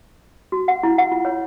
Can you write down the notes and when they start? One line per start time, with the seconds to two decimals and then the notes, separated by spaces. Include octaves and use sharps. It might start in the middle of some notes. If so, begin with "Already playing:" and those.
0.52 F#4
0.68 F#5
0.83 E4
0.98 F#5
1.12 F4
1.25 C#5